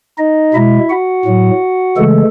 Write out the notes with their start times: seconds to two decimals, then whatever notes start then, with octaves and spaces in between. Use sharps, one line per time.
0.18 D#4 D#5
0.54 B2 G#3 E4 E5
0.90 F#4 F#5
1.25 A2 F#3
1.97 C#3 E3 G#3 A3 A4